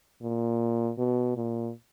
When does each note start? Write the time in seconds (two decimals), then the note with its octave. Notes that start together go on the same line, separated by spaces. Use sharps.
0.22 A#2
0.98 B2
1.36 A#2